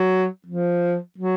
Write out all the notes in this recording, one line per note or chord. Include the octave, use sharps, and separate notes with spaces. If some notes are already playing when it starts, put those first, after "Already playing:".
Already playing: F#3
F3
F#3